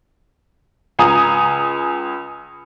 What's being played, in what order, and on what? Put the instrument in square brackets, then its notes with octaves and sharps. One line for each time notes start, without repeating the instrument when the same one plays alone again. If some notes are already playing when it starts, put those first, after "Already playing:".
[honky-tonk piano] C#2 G#5 A#5 D#6